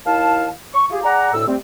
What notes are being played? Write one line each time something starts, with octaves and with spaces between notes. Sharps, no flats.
D#2 D#3 E4 F5 A5
C#6
F4 G4 G#4
G#4 D5 F#5 A#5
D2 A2 E6
G3 A3 C4